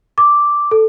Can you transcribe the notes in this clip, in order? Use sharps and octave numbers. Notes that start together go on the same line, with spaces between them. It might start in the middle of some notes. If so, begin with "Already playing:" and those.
D6
A4